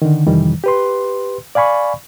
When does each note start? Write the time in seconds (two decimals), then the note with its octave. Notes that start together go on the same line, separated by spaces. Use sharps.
0.02 D3 D#3
0.27 F2 C3 D#3 E3 G3
0.64 G4 B4 C6
1.55 D5 F5 G#5 B5 C#6